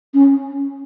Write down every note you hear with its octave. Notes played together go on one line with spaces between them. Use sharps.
C#4